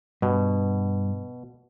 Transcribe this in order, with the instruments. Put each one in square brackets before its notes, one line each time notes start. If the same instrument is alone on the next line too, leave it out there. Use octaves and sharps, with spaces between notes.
[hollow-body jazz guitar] G2 [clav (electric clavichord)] B2